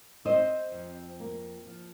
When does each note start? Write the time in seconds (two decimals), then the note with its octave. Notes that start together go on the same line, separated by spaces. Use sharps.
0.25 C4 C5 D#5
0.72 F2
1.20 A#3
1.67 F3